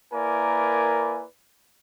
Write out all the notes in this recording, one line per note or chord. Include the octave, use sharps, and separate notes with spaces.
A#3 E4 A#4 B4 D5 G#5